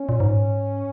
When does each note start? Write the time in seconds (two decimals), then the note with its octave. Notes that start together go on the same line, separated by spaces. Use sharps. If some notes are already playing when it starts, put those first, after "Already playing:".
Already playing: C#4
0.09 A#2
0.20 G#2